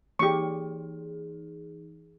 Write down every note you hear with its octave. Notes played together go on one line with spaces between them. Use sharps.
E3 D#4 G4 G#4 C#6